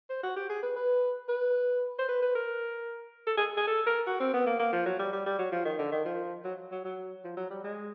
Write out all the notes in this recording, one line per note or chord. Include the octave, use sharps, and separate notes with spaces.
C5
F#4
G4
G#4
B4
B4
B4
C5
B4
B4
A#4
A4
G#4
G#4
A4
A#4
F#4
C4
B3
A#3
A#3
F3
F#3
G3
G3
G3
F#3
F3
D#3
D3
D#3
F3
F#3
F#3
F#3
F3
F#3
G3
G#3